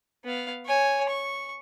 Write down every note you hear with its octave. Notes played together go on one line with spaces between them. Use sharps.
B3 F5
C#5 G#5
C#6